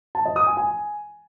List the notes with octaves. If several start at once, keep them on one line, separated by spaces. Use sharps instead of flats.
A5
D#5
D#6
G#5
G#5